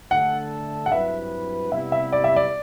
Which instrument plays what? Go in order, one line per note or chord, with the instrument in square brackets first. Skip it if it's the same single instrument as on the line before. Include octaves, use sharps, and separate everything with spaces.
[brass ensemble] D3 A3 D4 A4 [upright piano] F#5
[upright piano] F#5
[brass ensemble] G2 F#3 C4 E4 B4 [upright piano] E5
[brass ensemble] C3 G3 B3 E4 [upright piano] E5
[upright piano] E5
D5
E5
D5